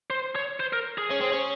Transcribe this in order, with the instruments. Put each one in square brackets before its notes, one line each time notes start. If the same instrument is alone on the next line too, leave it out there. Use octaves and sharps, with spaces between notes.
[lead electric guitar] C5
C#5
C5
A#4
G#4
[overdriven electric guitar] C#4
C4
C#4